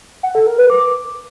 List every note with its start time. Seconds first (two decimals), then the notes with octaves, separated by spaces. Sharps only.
0.23 F#5
0.35 A4
0.46 A#4
0.58 B4
0.70 D6